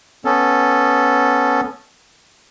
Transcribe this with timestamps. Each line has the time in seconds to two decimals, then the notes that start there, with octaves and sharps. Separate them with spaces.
0.25 B3 C#4 A4